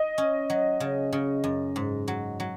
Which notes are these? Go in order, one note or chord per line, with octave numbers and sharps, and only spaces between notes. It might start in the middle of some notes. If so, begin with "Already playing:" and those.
Already playing: D#5
C#4
F#3
C#3
C#3
F#2
G#2
F#3
F#3